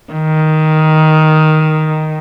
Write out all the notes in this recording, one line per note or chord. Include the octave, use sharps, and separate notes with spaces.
D#3